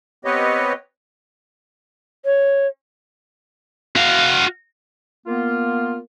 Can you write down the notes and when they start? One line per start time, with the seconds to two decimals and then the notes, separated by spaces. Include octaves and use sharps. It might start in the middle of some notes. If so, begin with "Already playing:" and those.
0.25 B3 C4 G4 B4 C#5 D#5
2.25 C#5
3.96 F#4 F5
5.26 A#3 B3 F4